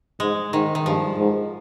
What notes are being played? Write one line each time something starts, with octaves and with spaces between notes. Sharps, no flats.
G#2 G#3
G#2 D#3
D#3
G2 F3
G#2